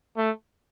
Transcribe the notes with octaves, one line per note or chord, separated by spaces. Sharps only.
A3